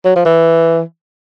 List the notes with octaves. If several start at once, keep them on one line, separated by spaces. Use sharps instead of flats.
F#3
F3
E3